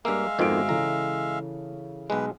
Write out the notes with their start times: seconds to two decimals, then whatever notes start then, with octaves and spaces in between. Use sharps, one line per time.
0.05 G2 G#3 A#3 E5 F5
0.39 G#1 F2 B2 D#3 F#4 D7
0.69 C#3 E3 A4 A#5
2.10 B1 G#3 B4